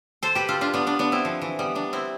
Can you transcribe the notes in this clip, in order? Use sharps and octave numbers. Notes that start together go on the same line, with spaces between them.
A4 C5
G4 B4
F4 A4
D4 F4
B3 D4
B3 D4
B3 D4
C4 E4
F3
E3
G3 B3
B3 D4
C4 E4